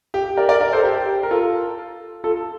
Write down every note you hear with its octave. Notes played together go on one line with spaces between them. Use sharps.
G4
A#4 D5
A#4 D5
A#4 D5
A4 C5
G4
A#4
F4 A4
F4 A4